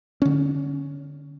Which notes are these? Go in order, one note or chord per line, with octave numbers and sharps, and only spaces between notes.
D3 C#4